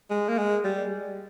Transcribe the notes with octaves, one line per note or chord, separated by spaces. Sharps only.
G#3
A#3
G#3
G3